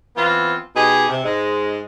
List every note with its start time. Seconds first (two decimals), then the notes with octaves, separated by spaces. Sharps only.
0.16 E3 B3 C4 F4
0.75 B2 D#4 G4 G#4
1.09 C3
1.23 G#2 G#3